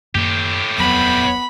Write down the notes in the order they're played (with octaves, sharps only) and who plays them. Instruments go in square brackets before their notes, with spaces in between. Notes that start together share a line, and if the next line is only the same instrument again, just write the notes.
[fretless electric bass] F#2 D#3 A#3 [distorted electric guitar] A2 G4
[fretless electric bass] D#1 F2 F#3 [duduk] B3 [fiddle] B5